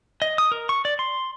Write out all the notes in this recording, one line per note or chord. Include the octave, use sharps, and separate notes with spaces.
D#5
D#6
A#4
C#6
D5
C6